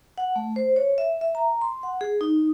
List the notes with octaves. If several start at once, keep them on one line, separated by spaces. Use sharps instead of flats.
F#5
A3
C5
C#5
E5
E5
A#5
C6
F#5
G#4
D#4